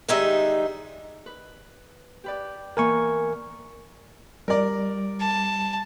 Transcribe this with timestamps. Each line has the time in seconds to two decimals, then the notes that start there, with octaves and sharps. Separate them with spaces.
0.08 D#3 G3 G#3 D#4 E5
1.26 B4
2.24 G4 B4 D5
2.77 E3 A#3 B3 A#4 G#5 C#6
4.48 G3 A#4 D5
5.20 A5